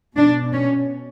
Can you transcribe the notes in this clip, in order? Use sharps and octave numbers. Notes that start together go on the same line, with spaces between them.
B2 D4
C#4